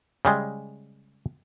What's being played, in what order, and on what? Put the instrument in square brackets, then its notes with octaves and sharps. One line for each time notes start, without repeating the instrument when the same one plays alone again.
[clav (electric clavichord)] C#3 G3 G#3